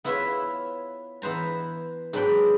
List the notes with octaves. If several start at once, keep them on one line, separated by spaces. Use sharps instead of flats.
B3 E4 F4 B4 C#5 E5
E3 B3 B4 C5 A#5
G#2 F#3 D4 B4 F#5 G5